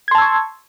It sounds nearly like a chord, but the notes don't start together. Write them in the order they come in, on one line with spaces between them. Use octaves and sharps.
G#6 C6 A5 E6 C#6